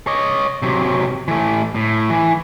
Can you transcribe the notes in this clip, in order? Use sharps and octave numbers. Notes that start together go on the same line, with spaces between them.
C#5 D#5
C3 F#3
E3 A3
A2
E3